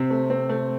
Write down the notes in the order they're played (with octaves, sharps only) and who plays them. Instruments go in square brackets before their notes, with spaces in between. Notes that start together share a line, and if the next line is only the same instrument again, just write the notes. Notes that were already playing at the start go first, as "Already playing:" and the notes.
Already playing: [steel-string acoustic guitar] C3 [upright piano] C4
[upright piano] A3
C4
A3